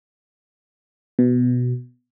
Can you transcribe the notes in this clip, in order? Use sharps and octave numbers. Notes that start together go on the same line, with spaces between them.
B2